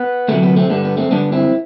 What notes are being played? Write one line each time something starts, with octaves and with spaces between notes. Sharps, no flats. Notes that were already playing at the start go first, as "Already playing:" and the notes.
Already playing: B3
D2 C3 F#3 A3
B3
A3 C4
G2 D3 G3 B3
B3
A3 C4
G2 D3 G3 B3 D4
C4 E4